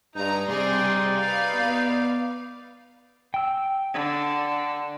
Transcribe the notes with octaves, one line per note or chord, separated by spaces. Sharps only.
G2 D#4 A#5
C3 G3 G#4 D5 C6
B4 F5
B3
G5 E6
D3